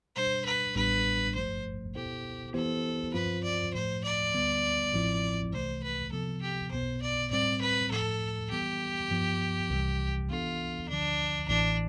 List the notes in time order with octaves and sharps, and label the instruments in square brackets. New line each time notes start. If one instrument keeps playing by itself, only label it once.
[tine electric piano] B2 G3 D4 [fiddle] C5
[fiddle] B4
[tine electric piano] A1 A2 G3 B3 D4 [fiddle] B4
[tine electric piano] G1 G2 F3 A3 [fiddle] C5
[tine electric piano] B2 B3 E4 A4 C5 [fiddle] G4
[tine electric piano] E3 B3 E4 G4 C5 [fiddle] A4
[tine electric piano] G2 F3 C4 F4 C5 [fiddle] B4
[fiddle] D5
[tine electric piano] A2 F3 A3 [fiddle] C5
[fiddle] D5
[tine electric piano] D2 D3 G3 B3
A1 A2 F3 C4 E4
[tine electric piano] C2 C3 E3 A3 [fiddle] C5
[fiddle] B4
[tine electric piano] C3 F3 B3 [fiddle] A4
[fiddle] G4
[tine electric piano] B1 B2 B3 [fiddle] C5
[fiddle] D5
[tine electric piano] A2 G3 C4 [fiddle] D5
[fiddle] B4
[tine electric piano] A2 F3 A3 [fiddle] A4
[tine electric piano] E3 G3 B3 [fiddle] G4
[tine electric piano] G2 F3 B3
C2 C3 E3 G3
[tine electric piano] E3 B3 D4 A4 [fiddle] F4
[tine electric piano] D2 D3 F3 [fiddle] D4
[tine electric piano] A1 A2 E3 [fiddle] D4